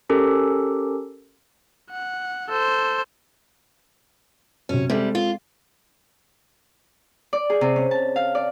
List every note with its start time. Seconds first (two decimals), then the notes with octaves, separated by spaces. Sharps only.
0.10 C#4 G4 A4 A#4
1.91 F#5
2.49 A4 C5
4.69 F#2 C3 C#4
4.90 C3 G3 G#3 C4 A4
5.15 F4
7.33 D5
7.50 G#4
7.61 C3
7.76 C#4
7.91 A5
8.16 F5
8.35 D5